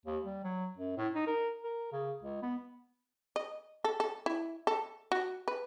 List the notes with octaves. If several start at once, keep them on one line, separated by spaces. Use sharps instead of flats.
D#2
G3
F#3
F#2
A2
D#4
A#4
A#4
C#3
C#2
B3
D#5
A4
A4
E4
A4
F#4
B4